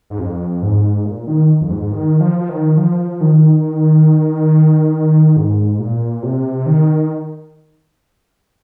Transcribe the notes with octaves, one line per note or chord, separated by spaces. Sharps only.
G#2
F2
G#2
A#2
D#3
F2
G#2
D#3
F3
F3
D#3
F3
D#3
G#2
A#2
C3
D#3